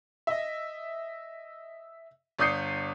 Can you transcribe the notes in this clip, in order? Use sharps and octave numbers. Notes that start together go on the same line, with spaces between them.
D#5 E5
G1 D5 D#6 G6 C7 C#7